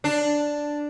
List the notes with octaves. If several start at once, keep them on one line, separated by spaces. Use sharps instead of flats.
D4